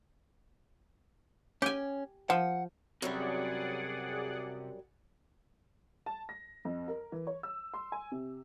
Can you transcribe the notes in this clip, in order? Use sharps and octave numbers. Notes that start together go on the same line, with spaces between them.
C#4 G4 G#5
F3 F#5
F#2 C3 F#3 G3 G#4 D5 F#5
A5
A#6
F2
A#4
E3
C#5
E6
C6
G#5
C3